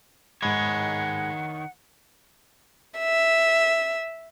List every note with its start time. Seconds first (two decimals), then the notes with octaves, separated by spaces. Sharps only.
0.43 G#2 D#3 G#3 C#5 F#5 B5
2.99 E5